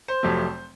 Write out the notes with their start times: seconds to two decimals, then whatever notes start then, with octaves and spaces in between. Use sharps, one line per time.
0.08 C5
0.23 F1 F2 C3 F#3 A3